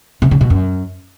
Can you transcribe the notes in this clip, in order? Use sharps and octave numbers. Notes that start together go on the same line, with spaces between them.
C3
C#3
B2
F#2